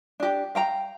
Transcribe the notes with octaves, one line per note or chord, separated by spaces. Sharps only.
D4 G4
F5 G5 A#5